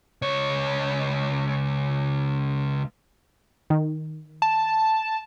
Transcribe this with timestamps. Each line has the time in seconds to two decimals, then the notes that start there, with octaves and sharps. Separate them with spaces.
0.22 C#2 C#5
3.70 D#3
4.42 A5